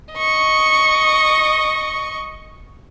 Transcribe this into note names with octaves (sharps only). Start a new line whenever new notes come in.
D#5 C#6